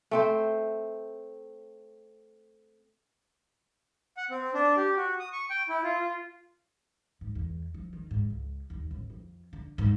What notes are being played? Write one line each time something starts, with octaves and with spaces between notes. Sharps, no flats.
A3 C4 C5
F#5
C4
D4
G4
F#4
D#6
C#6
G5
E4
F4
F4
G#2
E2
F3
D#3
G#2
C#2
D#2
A1
F2
D3
G#2